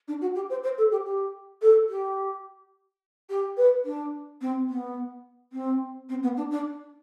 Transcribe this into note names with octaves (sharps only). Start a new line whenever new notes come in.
D4
F#4
G4
C5
C5
A4
G4
G4
A4
G4
G4
B4
D4
C4
B3
C4
C4
B3
D4
D4